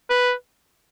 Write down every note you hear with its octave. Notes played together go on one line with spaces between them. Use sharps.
B4